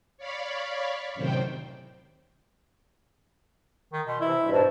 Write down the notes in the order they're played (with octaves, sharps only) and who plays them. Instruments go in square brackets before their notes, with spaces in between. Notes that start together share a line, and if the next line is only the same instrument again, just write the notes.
[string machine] C#5 D5 F5 B5 C#6
F#2 A2 C3 D#3 C5 G5
[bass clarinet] D#3
[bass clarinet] B2 [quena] C6
[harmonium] C3 E3 [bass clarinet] E4 [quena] E5
[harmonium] G2 B2
[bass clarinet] G#2 [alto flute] C5 [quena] A5